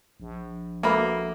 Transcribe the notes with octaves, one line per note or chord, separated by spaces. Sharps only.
A#1
A#3 B3 F#4 A4 E5 B5 D6